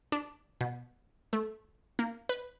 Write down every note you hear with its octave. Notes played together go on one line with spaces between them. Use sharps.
D4
B2
A3
A#3
B4